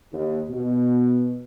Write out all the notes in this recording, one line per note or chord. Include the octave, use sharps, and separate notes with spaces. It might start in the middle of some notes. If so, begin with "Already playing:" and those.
D#2
B2